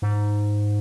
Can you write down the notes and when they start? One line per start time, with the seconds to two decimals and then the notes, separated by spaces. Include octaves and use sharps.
0.02 G#2